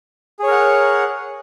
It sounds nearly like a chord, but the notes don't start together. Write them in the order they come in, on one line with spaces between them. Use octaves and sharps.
G#4 C#5 A#4 F#5